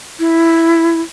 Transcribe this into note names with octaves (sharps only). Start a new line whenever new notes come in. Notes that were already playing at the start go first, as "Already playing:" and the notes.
E4